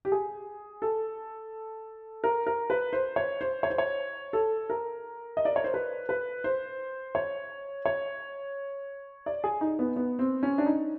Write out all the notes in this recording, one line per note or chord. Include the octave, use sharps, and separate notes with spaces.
G4
G#4
A4
A#4
A#4
B4
C5
C#5
C5
C#5
C5
C#5
A4
A#4
D#5
D5
C#5
C5
B4
B4
C5
C#5
C#5
D5
G#4
D#4
B3
B3
C4
C#4
D4
D#4